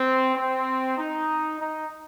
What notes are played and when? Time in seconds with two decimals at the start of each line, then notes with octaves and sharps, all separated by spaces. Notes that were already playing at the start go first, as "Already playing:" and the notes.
Already playing: C4
0.35 C4
0.97 D#4
1.59 D#4